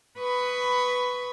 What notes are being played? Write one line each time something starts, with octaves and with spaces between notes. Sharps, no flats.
B4 B5 C#6 D#6